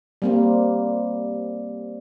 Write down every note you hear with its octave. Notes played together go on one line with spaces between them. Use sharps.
G3 A#3 C4